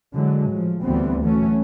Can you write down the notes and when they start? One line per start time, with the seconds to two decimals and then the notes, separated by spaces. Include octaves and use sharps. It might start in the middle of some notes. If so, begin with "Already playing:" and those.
0.15 D3 E3 F#3 G#3
0.53 A2 F3
0.83 D2 E3 G3 B3 C4
1.23 E3 F#3 A3 C#4